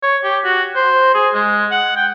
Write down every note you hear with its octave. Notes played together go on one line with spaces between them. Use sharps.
C#5
G4
F#4
C5
G#4
G#3
F#5
G5